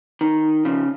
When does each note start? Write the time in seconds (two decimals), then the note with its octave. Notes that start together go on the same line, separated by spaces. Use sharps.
0.21 D#3
0.65 C#3 F3